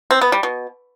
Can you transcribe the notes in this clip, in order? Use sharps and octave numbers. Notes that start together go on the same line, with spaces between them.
C4
B3
G3
B2